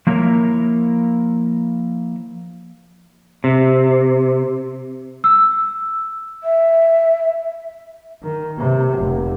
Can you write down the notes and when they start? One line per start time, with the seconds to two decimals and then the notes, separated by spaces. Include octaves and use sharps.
0.07 F3 A#3 E4 A#4 C#5
3.44 C3
5.24 E6
6.44 E5
8.23 D#3
8.58 C3
8.99 F1